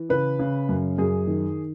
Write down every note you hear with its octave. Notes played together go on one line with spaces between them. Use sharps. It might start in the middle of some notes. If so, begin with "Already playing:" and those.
Already playing: E3
C#3 B4
C#3
F#2
F#2 G#4
D#3